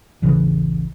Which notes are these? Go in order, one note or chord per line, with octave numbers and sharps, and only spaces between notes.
D1 A1 C#3 E3